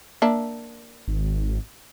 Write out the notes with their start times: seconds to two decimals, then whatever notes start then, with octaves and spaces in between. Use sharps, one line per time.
0.22 A#3 D4 E5
1.08 G#1